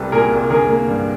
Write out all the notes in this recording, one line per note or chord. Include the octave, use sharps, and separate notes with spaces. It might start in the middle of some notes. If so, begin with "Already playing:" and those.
Already playing: C2 G3 A4 B4
A#2 G#4 A#4
C2
D3 G#4 A#4
A#3
G2